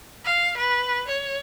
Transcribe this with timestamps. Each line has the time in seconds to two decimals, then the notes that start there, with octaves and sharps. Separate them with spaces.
0.25 F5
0.57 B4
1.07 C#5